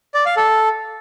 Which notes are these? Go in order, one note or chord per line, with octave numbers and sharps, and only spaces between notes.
D5
F5
A4